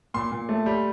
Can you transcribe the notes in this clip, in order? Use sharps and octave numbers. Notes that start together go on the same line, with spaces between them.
A#2 C6
A#2
A3
G3